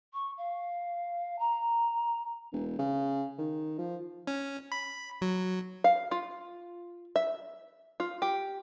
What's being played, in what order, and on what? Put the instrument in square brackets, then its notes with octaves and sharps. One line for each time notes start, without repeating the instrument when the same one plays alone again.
[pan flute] C#6
F5
A#5
[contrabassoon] E1
C#3
D#3
F3
[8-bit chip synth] C#4
B5
F#3
[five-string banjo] F5
F4
E5
F4
G4